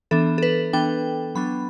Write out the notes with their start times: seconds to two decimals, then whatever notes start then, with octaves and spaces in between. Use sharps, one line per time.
0.11 E3 B3 D4 A4
0.38 A4
0.43 B4
0.73 E3 B3 D4 G5
1.35 F#3 B3 D4 B5